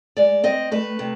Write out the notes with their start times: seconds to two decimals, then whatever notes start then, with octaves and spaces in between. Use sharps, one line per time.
0.17 G#3 D5
0.44 C4 D#5
0.71 A3 B4
0.99 C3